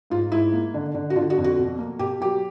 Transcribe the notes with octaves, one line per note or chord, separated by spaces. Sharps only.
G#2 F4
G#2 E4
A#3
D3
D3
F#4
D3 F4
F#4
F2
F#4
B2
A#3
B2 G4
F#3 G4